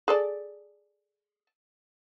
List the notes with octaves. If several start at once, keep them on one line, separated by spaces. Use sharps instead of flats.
G#4 A4 D5